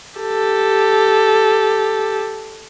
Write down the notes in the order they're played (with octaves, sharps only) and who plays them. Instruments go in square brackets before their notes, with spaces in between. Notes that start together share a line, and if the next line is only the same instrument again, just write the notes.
[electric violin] G4 A4